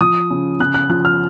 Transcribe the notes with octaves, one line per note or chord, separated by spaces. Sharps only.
F3 D#6
C#3
C#3 F#6
F#6
F3 F#6
F6